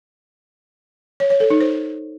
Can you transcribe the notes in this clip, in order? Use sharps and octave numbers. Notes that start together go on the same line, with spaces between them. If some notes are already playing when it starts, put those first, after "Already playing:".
C#5
C#5
A4
D#4
C5